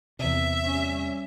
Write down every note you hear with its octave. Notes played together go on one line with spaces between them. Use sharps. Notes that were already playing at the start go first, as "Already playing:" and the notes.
E2 C3 E5
G3 C#4